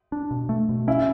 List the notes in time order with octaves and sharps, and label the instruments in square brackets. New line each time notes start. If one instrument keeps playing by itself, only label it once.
[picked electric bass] D4
B2
A3
B2
[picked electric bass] C#4 [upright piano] E4